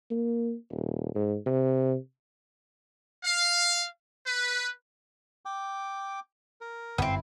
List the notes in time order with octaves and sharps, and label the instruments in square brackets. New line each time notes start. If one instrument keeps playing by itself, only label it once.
[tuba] A#3
D#1
G#2
C3
[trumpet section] F5
B4
[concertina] G5 D6
A#4
[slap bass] G1 F#2 [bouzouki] B3 C4 [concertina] E4